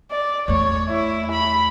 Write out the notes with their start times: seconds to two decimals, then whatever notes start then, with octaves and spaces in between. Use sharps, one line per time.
0.11 D5
0.48 E2 A3 C#5
0.89 E4
1.32 B5